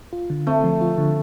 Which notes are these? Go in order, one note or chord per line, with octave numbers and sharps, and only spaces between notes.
F4
D3
A3 C4
F3
F4
D3